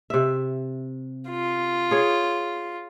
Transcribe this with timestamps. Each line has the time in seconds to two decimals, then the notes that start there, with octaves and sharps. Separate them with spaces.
0.10 C3 E5
1.30 F4
1.91 G#4 C#5